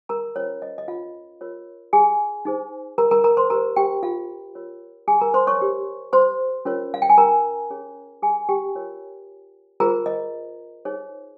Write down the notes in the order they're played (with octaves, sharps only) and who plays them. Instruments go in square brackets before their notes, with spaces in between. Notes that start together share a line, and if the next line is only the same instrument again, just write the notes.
[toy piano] A#4 A#5
C#4 F4 C5 C#5
D#5
D#5
F4 F5
F4 A#4 C#5
G#4 G#5
D#4 G#4 C5
A#4 A#5
A#4 A#5
A#4 A#5
C5 C6
G4 A#4 C5 A#5
G4 G5
F4 F5
F4 A#4 C#5
G#4 G#5
A#4 A#5
C5 C6
C#5 C#6
G4 A#4 C#5
C5 C6
C#4 F4 A#4 C#5
F5
G5
G#5
A#4 A#5
C#4 G#4 C#5
G#4 G#5
G4 G5
F4 A#4 C#5
F4 G#4 A#4 C5 A#5
D#5
D#4 G#4 C5 C#5